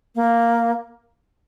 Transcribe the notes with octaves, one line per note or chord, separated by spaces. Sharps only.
A#3